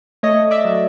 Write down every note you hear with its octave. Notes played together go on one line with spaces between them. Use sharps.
A3 C#5 D#5
D5 E5
F#3